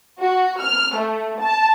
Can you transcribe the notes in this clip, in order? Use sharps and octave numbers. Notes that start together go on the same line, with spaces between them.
F#4
F6
A3
A5